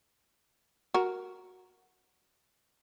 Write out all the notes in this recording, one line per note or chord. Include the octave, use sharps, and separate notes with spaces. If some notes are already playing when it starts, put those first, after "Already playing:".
F#4 A#4